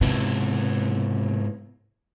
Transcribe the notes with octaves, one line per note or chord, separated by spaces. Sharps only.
G#2 C3 B3 E4